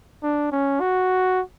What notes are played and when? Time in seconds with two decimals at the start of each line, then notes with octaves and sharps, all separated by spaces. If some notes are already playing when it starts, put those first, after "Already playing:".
0.23 D4
0.52 C#4
0.81 F#4